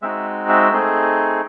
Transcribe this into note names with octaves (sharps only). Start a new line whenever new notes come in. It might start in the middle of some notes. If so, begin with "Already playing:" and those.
G#3 C4 D#4 F#4 E5
E5
A3 C4 D#4 G#4